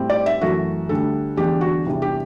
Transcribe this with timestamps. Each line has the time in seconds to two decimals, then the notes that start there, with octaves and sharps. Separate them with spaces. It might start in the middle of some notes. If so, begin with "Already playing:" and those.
Already playing: A2 G3 C4
0.10 D5
0.26 E5
0.41 F#2 E3 A3 F#4
0.89 D2 D3 G3 A4
1.37 E2 D3 G3 D4 G4
1.61 F#4
1.86 E2 C3 E3 G3 D4
2.02 G4